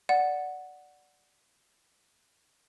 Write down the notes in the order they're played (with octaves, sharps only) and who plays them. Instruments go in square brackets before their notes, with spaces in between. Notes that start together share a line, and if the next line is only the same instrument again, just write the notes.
[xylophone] D5 F#5